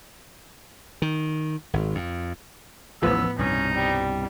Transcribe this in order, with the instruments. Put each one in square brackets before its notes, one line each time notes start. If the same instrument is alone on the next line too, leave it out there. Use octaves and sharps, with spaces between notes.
[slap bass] D#3
G#1
F2
[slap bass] A1 D#2 [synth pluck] A2 F3 B4 [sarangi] B3 [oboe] E6
[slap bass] C2 G2 B2 [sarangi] C#4 [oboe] D#4
[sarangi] G3